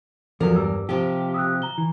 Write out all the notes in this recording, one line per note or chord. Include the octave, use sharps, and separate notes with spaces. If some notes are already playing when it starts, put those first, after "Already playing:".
E2 F3 F#3 A4 A#4
G2 G3 E6
C3 F3 G4
D#6 E6 F#6
A#5 G7
E3